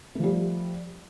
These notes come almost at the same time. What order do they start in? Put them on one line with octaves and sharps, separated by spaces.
A3 F3 G3